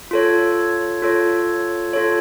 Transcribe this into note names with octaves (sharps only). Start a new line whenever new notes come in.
F4 A4 C#5
F4 A4 C#5
F4 A4 C#5